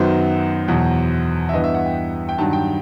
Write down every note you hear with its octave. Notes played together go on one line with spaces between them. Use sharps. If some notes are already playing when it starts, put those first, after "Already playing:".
Already playing: F#2 D#3 F#3 B3 C5
E2 B2 F#3
E5
G2 E3 B3 D#5
E5
F#5
G5
G5
G2 D#3 F#3 A5
G5